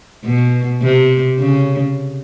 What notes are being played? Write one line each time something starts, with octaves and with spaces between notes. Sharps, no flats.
B2
C3
C#3